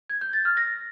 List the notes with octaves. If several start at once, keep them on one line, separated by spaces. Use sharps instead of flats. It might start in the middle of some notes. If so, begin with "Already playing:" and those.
G#6
G6
A6
F6
A#6